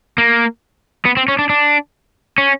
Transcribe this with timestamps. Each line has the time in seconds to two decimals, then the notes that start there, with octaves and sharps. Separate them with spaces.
0.18 A#3
1.05 B3
1.17 C4
1.28 C#4
1.39 D4
1.50 D4
2.38 C#4